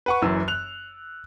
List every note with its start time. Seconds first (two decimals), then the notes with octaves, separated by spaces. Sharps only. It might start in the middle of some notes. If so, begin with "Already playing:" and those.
0.06 B4 F#5 C#6
0.22 F#1 F#2 E3 E6
0.48 F#6 F7